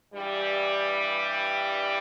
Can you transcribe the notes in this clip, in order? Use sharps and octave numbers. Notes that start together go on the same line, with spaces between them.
G2 E3 G3